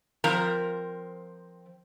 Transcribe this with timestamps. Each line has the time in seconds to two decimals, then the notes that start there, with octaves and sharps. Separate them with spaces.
0.24 F3 C4 A#4 A#5